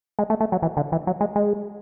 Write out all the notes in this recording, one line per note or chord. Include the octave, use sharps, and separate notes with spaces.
G#3
A3
A3
F#3
E3
D3
E3
F#3
G#3
G#3